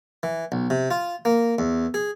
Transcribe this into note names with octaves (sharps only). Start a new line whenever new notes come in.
E3
B1
C3
F4
A#3
E2
G#4